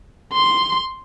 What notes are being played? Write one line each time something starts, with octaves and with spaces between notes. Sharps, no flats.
C6